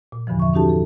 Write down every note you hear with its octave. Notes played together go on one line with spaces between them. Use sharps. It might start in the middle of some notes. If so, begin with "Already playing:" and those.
A#2
E2 G2 D3 E3 F3
E5 C#6
C#4 D#4 F#4 G4 A4 A5
A4